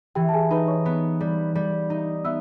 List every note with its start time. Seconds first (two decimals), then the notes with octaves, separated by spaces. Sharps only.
0.15 E3 G4 G5
0.29 A5
0.34 G#4 G#5
0.50 D#4 B4 B5
0.68 C#5 C#6
0.86 B3
1.20 G3
1.55 G3
1.90 D#4
2.25 B3 E5 E6